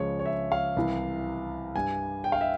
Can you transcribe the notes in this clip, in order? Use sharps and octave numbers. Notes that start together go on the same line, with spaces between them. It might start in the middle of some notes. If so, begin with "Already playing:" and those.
Already playing: C#2 C#3 F3 G#3 C#5
C#5
E5
F5
C2 C3 E3
G2 G3 G#5
G5
F5
E5